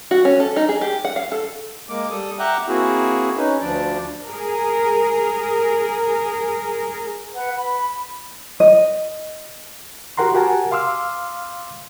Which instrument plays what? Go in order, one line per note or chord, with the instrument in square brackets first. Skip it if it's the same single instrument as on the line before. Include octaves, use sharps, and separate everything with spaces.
[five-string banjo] F#4
C#4
A4
D#4
G#4
G4
F#5
F5
A4
[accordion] G#3 A#3 D6
G3 A4 D#6
E5 F#5 G5 A#5 D6 F#6
A#3 C4 E4 F#4 G#4
C#4 D#4 B4
D2 F3 D4 D5
[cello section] G#4 A#4
[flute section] B4 F#5
B5
[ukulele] D#5
[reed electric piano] F#4 G4 A#4 F#5 A#5 C6
F#4 G4 A#4 F#5 G#5 A5
F5 C6 D6 E6 F6